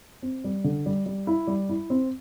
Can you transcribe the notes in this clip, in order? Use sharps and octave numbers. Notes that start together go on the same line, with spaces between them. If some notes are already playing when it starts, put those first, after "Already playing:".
C4
G3
D3
G3
G3
E4
G3
E4
C4